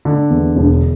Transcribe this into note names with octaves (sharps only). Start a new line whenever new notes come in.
D3
E2
E1